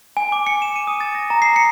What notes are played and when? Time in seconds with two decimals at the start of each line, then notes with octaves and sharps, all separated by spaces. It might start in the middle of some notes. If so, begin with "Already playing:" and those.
0.17 G#5
0.32 D6
0.47 C#7
0.62 E7
0.76 D#7
0.87 D#6
1.00 A6
1.15 A#6
1.30 A#5
1.42 C7
1.56 C#7